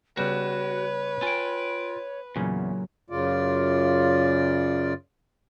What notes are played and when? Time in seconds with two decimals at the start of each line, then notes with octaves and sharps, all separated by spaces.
0.17 C#3 G3 B3 F#4 B4 C#5
1.22 F4 G5 G#5
2.36 E2 A#2 C#3 F#3 C#4
3.10 F#2 C#3 F4 D5